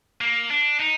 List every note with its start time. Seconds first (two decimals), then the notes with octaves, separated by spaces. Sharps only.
0.21 A#3
0.50 D4
0.80 D#4